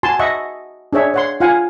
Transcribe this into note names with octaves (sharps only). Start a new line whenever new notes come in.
F#4 G#5 A5 C6
D#5 E5 F#5 C#6
D4 G#4 C#5 E5
C#5 F#5 C6
F4 F5 F#5 G#5